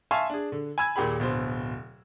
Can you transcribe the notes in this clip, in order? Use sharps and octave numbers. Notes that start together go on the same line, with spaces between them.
E5 F5 G#5 A5 C6 C#6
D4 G#4
D3
G#5 B5 E6 G#6
D#2 A#2 G4 G#4 B5
D1 B2 C5